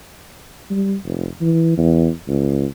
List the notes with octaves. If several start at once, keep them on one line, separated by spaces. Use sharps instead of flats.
G3
F1
E3
E2
C#2